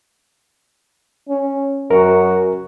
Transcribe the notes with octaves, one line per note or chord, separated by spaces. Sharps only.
C#4
F#2 F#4 A#4